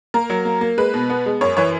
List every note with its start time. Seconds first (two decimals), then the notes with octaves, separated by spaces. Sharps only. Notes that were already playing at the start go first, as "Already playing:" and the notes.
0.14 A#3 A#4
0.30 F#3
0.45 A#3
0.61 A#3
0.78 G#3 B4
0.94 B2
1.10 B3
1.26 G#3
1.41 F#2 C#5
1.57 E3 C#5